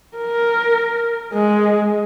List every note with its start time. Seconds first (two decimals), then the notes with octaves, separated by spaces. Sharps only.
0.17 A#4
1.34 G#3